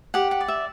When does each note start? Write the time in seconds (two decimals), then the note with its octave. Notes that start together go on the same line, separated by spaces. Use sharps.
0.14 G4 F#5
0.31 F#5
0.41 D5
0.48 E5